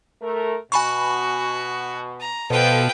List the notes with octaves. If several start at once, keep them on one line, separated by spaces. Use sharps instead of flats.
A3 A#4
B2 F#4 G#5 B5 C#6
A#5
B2 F3 A4 B4 G5